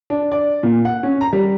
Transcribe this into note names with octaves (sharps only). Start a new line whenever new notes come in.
D4
D5
A#2
F#5
C#4
A#5
G3